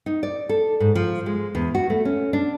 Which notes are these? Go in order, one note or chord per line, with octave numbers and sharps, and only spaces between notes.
D#4
D5
A4
G#2
F3
G#3
E2
F#4
A3
C#4
D4